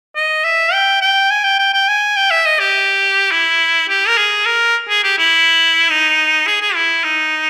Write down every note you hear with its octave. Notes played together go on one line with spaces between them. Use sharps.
D#5
E5
G5
G5
G#5
G5
G5
G5
G#5
G5
E5
D#5
G4
E4
G4
A#4
G#4
A#4
G#4
G4
E4
D#4
G#4
G#4
E4
D#4